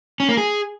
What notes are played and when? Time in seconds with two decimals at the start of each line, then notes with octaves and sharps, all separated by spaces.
0.20 C#4
0.29 A#3
0.37 G#4